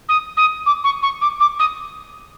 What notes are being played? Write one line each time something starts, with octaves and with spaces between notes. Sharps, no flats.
D#6
D#6
D6
C#6
C#6
D6
D6
D#6